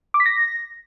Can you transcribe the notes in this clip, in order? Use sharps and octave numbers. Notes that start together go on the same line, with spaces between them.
D6
B6
A#6